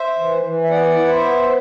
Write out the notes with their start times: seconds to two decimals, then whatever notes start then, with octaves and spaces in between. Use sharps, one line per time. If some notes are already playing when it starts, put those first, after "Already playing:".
Already playing: C5 E5
0.18 E3
0.43 E3
0.64 E5
0.69 B3 D5 F#5
0.95 E4
1.08 C5 E5
1.21 B3